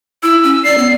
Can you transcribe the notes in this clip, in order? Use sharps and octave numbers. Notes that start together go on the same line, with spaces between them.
E4 E6
C#4
D5 C7
B3